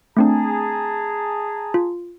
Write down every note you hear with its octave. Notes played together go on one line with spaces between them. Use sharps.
A3 C4 D4 G#4 A5 A#5
F4